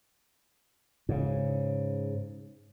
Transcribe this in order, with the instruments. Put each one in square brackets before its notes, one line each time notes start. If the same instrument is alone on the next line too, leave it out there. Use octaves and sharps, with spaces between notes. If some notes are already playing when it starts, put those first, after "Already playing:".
[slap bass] G#2 C#3